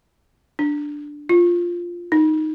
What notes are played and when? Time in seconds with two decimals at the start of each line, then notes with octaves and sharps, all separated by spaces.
0.59 D4
1.29 F4
2.12 D#4